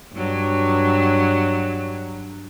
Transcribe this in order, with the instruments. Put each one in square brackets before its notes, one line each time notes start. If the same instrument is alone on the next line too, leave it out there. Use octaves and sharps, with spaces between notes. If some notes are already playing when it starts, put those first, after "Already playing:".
[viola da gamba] G2 F#3